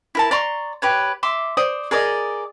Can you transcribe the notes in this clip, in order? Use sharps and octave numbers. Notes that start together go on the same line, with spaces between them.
E4 A#4 A5
D5 A#5 C6 C#6
G4 B4 C#5
E5 C6 D6
C5 D5 D#6
G#4 A#4 D5 D#5